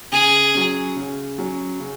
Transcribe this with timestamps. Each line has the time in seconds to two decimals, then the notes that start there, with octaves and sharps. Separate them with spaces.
0.12 C#3 G#4
0.55 F#3 C#4
0.96 C#3
1.38 F#3 C#4
1.80 C#3